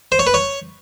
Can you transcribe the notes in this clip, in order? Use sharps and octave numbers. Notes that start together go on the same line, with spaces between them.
C5
C#5
B4
C#5